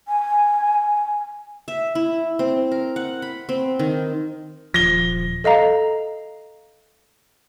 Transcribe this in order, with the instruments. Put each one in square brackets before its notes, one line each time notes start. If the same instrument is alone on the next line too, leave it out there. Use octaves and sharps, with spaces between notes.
[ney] G#5
[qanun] E5
E4
C4
A#4
F#5
B5
C4
D#3
[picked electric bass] D#1 F3 [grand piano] A#6 G7
[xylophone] A4 D#5 F5 A#5